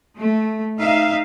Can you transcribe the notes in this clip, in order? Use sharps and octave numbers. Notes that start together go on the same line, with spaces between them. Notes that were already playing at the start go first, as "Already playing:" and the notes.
A3
D#4 E5 F5